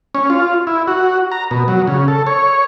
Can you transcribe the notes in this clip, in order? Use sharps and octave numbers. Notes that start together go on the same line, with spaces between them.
C#4
F4
E4
F#4
A#5
B2
F#3
C#3
A4
C#5